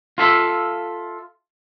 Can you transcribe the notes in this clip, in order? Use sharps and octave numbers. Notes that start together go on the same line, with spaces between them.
F4 A4 E5